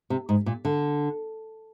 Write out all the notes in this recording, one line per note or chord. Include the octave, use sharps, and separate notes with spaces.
C3
G#2
A#2
D3